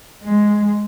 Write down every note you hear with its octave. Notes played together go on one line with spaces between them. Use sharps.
G#3